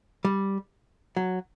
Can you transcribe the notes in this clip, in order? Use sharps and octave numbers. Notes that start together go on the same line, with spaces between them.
G3
F#3